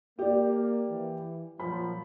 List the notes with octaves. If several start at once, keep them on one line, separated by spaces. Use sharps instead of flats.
A#3 G4 D5
E3
A#2 F3 F#3 B5